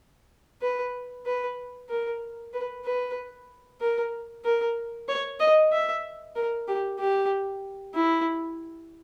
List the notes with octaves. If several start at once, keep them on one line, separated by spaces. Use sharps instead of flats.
B4
B4
A#4
B4
B4
A#4
A#4
C#5
D#5
E5
A#4
G4
G4
E4